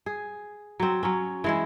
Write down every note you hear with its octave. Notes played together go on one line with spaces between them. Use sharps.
G#4
F#3 C4
F#3 C#4
E3 G#3 E4